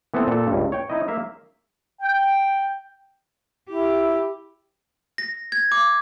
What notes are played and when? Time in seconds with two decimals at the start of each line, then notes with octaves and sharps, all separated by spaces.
0.14 E3 B3 C4 A4
0.27 A#2 A4
0.47 C#2 G2
0.72 C#5 G5
0.90 D#4 E4 D#5
1.08 A#3 E5 F5
2.02 G5
3.69 E4 G4
5.18 A#6
5.52 G#6
5.72 D6